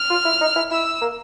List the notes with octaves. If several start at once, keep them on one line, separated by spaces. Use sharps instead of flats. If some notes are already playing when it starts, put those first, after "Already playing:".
Already playing: F6
F4
E4
D#4
E4
E4 E6
A#3